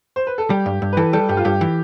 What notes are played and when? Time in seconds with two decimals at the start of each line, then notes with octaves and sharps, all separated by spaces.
0.16 C5
0.27 B4
0.38 A4
0.50 G3 G4
0.66 G2
0.82 G2
0.93 B4
0.97 E3 A4
1.13 G3 A4
1.29 G2 G4
1.37 F4
1.45 G2 G4
1.61 E3